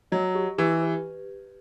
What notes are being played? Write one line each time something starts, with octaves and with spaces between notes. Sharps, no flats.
F#3 D#5
G4
E3 G4
B4